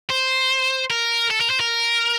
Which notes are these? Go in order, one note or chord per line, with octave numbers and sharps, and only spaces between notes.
C5
A#4
A4
A#4
C5
A#4